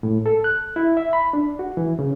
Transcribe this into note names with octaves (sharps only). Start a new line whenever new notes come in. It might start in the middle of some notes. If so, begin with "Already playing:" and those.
A2
A4
F#6
E4
E5
B5
D4
F#4
E3
C#3